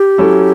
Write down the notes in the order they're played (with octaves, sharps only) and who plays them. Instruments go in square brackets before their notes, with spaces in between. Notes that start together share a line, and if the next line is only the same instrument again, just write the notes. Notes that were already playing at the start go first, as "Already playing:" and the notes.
Already playing: [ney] G4
[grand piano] F#3 C#4 E4 A4